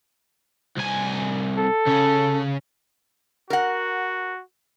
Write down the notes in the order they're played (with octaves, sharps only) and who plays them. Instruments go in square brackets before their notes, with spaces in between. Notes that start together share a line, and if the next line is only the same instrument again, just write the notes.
[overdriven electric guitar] C2 G#5
[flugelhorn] A4
[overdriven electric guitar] C#3 C#4
[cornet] F#4 [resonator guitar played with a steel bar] A#4 F#5